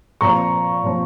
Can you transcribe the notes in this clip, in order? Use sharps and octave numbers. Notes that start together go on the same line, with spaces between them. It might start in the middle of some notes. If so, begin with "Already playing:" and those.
A#2 F3 C4 A#5 C#6
A#2 F3 C4